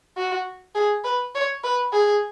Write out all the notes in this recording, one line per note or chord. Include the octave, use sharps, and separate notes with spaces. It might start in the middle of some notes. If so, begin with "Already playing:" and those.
F#4
G#4
B4
C#5
B4
G#4